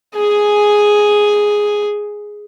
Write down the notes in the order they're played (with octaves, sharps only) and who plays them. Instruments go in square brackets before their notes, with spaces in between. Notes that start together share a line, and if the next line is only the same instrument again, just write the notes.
[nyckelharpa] G#4 G#5